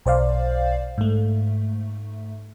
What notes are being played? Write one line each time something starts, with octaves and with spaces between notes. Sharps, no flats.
B1 C5 D5 F5
G#2 A3